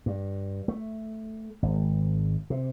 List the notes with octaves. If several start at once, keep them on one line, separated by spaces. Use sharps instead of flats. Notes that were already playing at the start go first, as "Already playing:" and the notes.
G2
A3
G#1
C3